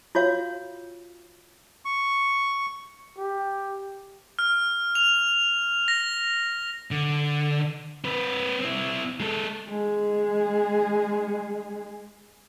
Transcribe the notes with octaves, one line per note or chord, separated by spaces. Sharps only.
F4 F#4 C#5 F5
C#6
G4
F6
F7
A#6
D3
C4 B4
C4 E4
G#3 A4
G#3 G#4